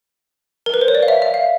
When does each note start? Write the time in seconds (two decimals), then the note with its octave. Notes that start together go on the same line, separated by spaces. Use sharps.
0.66 A#4
0.74 B4
0.81 C5
0.88 C#5
0.95 D5
1.03 F5
1.08 E5
1.22 E5
1.34 F5